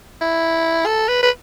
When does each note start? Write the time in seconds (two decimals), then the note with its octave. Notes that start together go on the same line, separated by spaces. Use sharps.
0.21 E4
0.86 A4
1.08 B4
1.23 B4